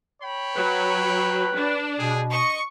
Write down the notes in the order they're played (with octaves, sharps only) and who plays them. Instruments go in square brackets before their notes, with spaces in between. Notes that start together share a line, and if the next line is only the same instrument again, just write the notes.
[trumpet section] C#5 G5 B5
[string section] F#3 [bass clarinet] B4
[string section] D4
[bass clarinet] B2 [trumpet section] G3 G#4
[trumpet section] D#5 [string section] C#6